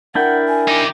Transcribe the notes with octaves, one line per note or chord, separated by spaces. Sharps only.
D4 E4 A#4 F#5 G5
G#5
D#4 G4